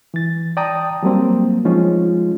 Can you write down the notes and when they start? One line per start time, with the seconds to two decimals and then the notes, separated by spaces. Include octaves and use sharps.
0.14 E3 A6
0.57 D5 G5 A5 A#5 D#6
1.03 F#3 G3 A#3 C4
1.65 F3 G#3 C#4 D#4 F4